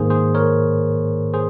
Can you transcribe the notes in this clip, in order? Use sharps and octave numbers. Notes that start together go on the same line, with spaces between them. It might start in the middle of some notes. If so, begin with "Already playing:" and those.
Already playing: G#2 D#3 A#3 G#4 C5
G#4 C5
A#4 C#5
G#4 C5